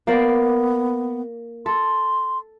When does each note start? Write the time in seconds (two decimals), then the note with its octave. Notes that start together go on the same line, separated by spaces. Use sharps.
0.07 A#3 B3 C5 D5
1.66 A4 C6